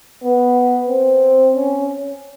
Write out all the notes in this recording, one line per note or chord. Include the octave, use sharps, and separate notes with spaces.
B3
C4
C#4